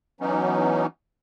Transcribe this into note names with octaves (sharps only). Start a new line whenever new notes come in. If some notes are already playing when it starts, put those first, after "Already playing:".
E3 F#3 B3 C#4 D#4